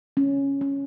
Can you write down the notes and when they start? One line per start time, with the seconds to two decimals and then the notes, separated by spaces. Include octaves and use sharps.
0.17 C#4
0.61 C#4